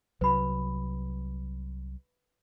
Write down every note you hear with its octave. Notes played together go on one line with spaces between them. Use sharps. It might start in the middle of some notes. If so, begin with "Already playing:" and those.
C2 F#3 B4 B5